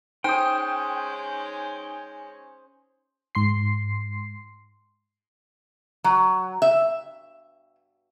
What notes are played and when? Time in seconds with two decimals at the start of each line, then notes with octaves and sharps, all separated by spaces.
0.24 G#3 C#4 D#4 C5 G5 G#5 D#6 G6
3.35 G#2 C6 C7
6.04 F#3
6.62 E5